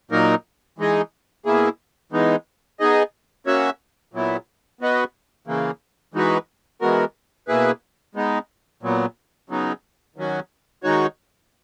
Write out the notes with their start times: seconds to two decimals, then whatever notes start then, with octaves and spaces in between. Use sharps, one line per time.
0.11 A#2 F#3 A#3 D#4 A#4
0.78 E3 G#3 D#4 G#4 D#5
1.45 B2 A#3 E4 G#4
2.12 E3 G#3 B3 D#4
2.80 B3 D#4 G#4 D#5
3.46 A#3 C#4 F#4 C#5 E5
4.14 A#2 F#3 B3 E4
4.81 B3 F#4 B4 D#5
5.47 C#3 E3 A#3
6.14 E3 G#3 D#4 F#4 B4
6.81 E3 G#3 B3 F#4 A#4
7.48 B2 A#3 E4 G#4 B4
8.15 G#3 B3 D#4
8.83 A#2 F#3 B3
9.50 C#3 F#3 B3 D#4
10.16 D#3 F#3 C#4 F#4
10.83 D#3 G#3 D#4 F#4 C#5